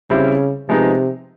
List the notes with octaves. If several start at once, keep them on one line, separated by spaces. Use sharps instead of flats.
C#3 G3 C4 E4
C3 F3 G#3 B3 D#4